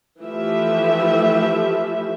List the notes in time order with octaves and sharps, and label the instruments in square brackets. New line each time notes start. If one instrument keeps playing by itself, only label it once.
[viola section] E3 F3 A3 E4 G4 E5